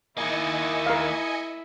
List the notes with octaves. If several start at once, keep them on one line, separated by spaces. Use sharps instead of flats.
D#3 A#3 E4 D#5 G#5 C#7
A#4 F5